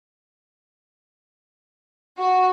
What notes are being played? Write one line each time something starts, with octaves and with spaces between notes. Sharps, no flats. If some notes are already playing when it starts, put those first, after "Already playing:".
F#4